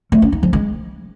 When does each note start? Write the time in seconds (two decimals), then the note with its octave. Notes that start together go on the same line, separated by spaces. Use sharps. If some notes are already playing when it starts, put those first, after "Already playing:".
0.12 A3
0.22 C#4
0.32 D#4
0.43 F3
0.53 G#3